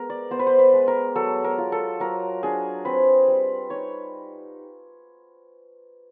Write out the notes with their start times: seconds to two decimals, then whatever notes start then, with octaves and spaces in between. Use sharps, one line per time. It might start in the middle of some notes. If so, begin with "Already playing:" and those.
Already playing: G#3 B3 A#4
0.10 D5
0.31 B3 C5
0.39 B4
0.47 C5
0.59 B4
0.73 G#3
0.88 A#4
1.15 F#3 A4
1.44 A#4
1.58 F4
1.72 A4
2.00 F#3 A#4
2.43 D4 G#4
2.85 C4 B4
3.28 G3
3.70 D#4 C#5